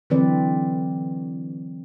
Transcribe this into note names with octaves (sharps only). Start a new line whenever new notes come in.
D3 E3 F#3 C4 B4 D5